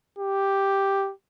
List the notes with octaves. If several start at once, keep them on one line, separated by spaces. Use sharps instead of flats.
G4